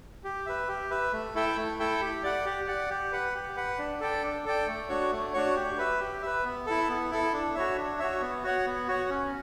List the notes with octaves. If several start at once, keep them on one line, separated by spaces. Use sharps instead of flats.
G4
B4 E5
G4
B4 E5
A3
E4 A4 E5 G5
A3
E4 A4 E5 G5
G4
D5 F#5
G4
D5 F#5
G4
B4 F#5
G4
B4 F#5
D4
A4 D5 G5
D4
A4 D5 G5
A3
D4 F#4 C#5
A3
D4 F#4 C#5
G4
B4 E5
G4
B4 E5
B3
E4 A4
B3
E4 A4
D4
F#4 C#5 E5
D4
F#4 C#5 E5
B3
F#4 C#5 F#5
B3
F#4 C#5 F#5
C#4